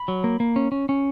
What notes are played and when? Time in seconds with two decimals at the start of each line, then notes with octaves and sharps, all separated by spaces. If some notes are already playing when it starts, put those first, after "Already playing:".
Already playing: B5
0.08 F#3
0.24 A#3
0.40 A#3
0.56 C#4
0.72 C#4
0.89 C#4